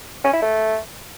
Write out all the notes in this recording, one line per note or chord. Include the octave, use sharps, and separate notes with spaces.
C#4
E4
A3